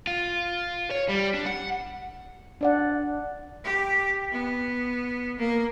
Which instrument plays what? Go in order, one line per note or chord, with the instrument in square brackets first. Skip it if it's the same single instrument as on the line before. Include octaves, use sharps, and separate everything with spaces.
[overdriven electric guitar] F4
C#5
G3
D4
F#5
[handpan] D4 D5 F#5
[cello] G4
B3
A#3